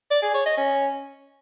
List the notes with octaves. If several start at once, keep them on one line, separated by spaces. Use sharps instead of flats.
D5
G#4
C#5
D#5
C#4